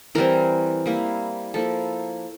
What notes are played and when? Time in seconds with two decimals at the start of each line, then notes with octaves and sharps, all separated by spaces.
0.15 E3 G3 C4 A#4
0.86 G3 A#3 E4
1.54 F3 A#3 E4 A4